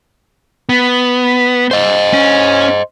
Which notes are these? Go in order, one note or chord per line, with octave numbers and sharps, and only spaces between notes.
B3
C5 D#5
C#4